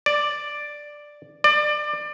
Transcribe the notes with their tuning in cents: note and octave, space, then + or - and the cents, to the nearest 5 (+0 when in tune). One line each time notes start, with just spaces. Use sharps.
D5 +5
D5 +25